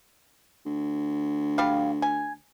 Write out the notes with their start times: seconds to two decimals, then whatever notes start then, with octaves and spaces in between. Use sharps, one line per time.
0.65 D2
1.58 G3 F5
2.02 G#5